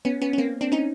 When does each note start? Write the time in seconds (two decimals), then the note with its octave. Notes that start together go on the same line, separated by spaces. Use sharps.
0.05 B3 C#4
0.22 B3 C#4
0.33 C#4
0.38 A#3 C4
0.61 C4 D4
0.72 C#4 D#4